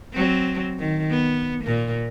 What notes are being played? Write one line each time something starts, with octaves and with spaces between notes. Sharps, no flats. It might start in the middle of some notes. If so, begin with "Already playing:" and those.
F#3 C4
D#3
B3
A#2 A#3